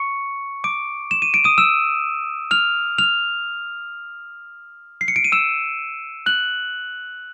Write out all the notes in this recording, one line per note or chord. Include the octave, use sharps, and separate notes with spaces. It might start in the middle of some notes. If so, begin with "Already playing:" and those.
Already playing: C#6 C#7
D6 D7
E7
D#7
D7
D#6 D#7
E6 E7
F6 F7
F6 F7
C7
C#7
D7
D#7
E6 E7
F#6 F#7